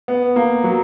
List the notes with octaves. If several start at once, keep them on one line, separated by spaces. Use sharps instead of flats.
B3
A#3
F#3